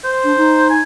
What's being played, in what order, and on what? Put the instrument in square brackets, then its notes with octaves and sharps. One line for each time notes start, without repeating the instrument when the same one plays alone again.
[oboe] C5
[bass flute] D4
D#4
[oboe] G#5